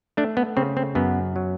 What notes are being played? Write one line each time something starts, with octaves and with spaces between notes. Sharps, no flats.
A3 D4
B3
C#3 C4
C4
F#2 B3
F#3